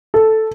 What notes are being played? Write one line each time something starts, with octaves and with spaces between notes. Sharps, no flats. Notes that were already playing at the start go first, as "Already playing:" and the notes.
A4